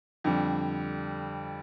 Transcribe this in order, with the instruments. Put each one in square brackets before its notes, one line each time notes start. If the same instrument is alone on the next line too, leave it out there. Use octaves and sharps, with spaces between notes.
[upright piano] F2 D3 G3